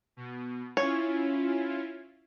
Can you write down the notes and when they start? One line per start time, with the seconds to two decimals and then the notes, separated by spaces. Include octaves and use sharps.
0.17 B2
0.77 C#4 E4 F4 C#5